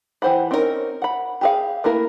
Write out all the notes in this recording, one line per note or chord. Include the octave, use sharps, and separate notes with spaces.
E3 G4 C5 F#5 B5
C4 C#4 D#4 E4 A#4
F#5 B5
G4 G#4 F5
A3 A#3 E4 A#4 B4